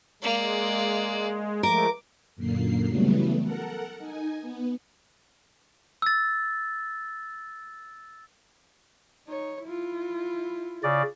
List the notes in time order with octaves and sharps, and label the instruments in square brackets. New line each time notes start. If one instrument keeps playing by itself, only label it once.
[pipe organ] G#3 [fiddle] A#3 D5
[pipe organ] F3 G#3 A3 [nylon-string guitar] A#4 [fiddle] D6
[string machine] F#2 A#2 D3 A#3 C7
C#3 E3 F#3 G3 A3 B3
A4 A#4 F#5
D#4 G#5
B3
[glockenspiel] E6 A6
[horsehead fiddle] D#4 C#5
E4 F4
[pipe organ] C#3 D5